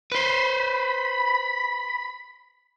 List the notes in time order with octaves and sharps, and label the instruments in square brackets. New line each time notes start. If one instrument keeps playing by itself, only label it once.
[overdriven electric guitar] B4 C5 [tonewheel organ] B5